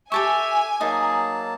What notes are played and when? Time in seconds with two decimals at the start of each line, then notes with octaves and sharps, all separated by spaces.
0.12 G4 A4 E5 G#5 C#6
0.81 F#3 A#3 D#4 G#4 A5